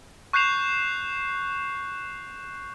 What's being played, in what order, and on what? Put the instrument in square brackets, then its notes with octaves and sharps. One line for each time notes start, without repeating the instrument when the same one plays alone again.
[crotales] C#6 F#6 G6 C7 E7 F7